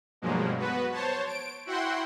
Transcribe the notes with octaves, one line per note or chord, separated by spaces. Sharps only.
G2 B2 F3 F#3 G#3 A#3
B3 F#4 B4
C5 C#5 A5
D7
E4 F#4 F#5 G5 C6